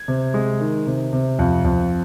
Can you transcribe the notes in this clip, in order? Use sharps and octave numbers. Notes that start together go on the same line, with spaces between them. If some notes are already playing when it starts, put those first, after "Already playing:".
Already playing: G#6
C3
G#3
D#3
C3
C3
F2
F2